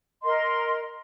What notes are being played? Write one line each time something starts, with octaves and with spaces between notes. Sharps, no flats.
A#4 D#5 C6